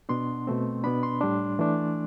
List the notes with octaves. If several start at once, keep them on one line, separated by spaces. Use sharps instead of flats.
B2 B3 D4 C6
B2 A3 C4
B2 B3 D4 B5
C6
A2 G3 D4
E3 A3 D4